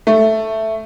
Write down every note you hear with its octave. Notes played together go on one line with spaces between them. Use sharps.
A3